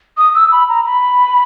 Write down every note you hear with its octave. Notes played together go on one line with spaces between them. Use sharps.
D#6
E6
B5
A#5
B5